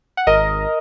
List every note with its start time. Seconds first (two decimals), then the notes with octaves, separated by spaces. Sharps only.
0.17 F#5
0.27 G#1 A#4 D#5